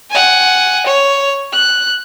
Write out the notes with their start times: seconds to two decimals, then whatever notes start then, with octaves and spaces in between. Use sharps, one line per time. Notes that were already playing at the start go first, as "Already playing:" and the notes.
0.11 F#5 G#5
0.86 C#5
1.53 F#6